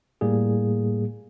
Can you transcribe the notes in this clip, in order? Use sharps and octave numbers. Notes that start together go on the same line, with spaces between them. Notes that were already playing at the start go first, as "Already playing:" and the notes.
A2 G3 A#3 G#4